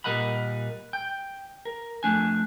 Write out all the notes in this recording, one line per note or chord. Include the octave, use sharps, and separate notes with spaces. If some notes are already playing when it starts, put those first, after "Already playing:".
A#2 G3 A#4 D#5 F#5 B5
G5
A#4
F2 A3 D4 G#5